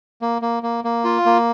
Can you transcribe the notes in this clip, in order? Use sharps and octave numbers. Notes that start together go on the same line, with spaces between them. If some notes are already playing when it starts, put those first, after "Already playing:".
A#3
A#3
A#3
A#3
F4
A#3